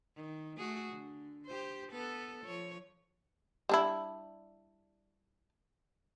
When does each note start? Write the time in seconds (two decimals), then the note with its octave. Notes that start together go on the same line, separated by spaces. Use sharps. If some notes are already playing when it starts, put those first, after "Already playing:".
0.16 D#3
0.57 A3 F#4 G#4
0.93 D3
1.47 G4 C5
1.92 B3 A4 B4
2.45 F3 C#5
3.69 G3 D4 E4